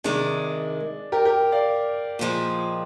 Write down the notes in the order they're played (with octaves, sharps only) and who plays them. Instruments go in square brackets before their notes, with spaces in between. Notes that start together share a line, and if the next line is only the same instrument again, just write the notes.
[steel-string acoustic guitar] C3 D#3 G#3 [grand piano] D4
[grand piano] G4 A#4
G4 A#4
D5 F5
[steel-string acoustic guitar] A#2 F3 G#3